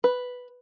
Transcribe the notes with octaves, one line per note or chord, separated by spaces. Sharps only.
B4